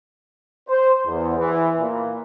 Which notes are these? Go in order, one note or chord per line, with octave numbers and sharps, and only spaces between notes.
C5
E2
E3
A#2